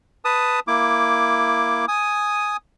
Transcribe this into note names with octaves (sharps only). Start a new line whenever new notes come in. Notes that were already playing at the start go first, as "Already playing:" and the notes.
B4 A5 D#6
A#3 E4 D6
G#5 D#6